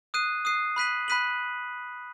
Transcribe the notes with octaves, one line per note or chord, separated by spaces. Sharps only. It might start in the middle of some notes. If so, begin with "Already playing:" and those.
D#6 F#6 C7 D#7
D#6 F#6 C7 D#7
B5 F#6 B6 D#7 F#7
B5 F#6 B6 D#7 F#7